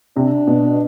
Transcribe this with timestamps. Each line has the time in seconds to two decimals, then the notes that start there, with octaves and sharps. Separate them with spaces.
0.16 C3 D4
0.47 B2